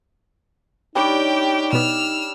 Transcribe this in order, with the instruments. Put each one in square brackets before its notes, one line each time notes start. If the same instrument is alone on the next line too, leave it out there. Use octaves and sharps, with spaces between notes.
[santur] G3 D4 C#5 [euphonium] D#4 [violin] G4 G5
[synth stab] B2 B3 [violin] E6 F6